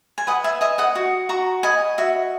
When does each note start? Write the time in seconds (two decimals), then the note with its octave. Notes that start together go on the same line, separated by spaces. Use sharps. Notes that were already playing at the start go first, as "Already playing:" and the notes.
0.18 G#5
0.27 B4 D#5 F#5
0.44 E5 G#5
0.61 D#5 E5 G#5
0.78 D#5 F#5
0.95 F#4
1.29 F#4 A#5 C#6
1.63 D#5 G#5 B5
1.98 F#4 E5